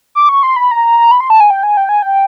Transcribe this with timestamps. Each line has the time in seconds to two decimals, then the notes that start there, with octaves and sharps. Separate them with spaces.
0.15 D6
0.29 C#6
0.43 C6
0.56 B5
0.71 A#5
1.11 B5
1.21 C6
1.30 A5
1.40 G#5
1.50 G5
1.63 G#5
1.77 G5
1.89 G#5
2.02 G5